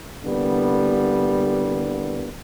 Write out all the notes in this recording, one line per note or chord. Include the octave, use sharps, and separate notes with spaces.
C2 D3 G3 A#3 B3